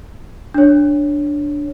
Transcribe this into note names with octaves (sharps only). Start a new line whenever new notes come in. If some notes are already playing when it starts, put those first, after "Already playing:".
D4 C#5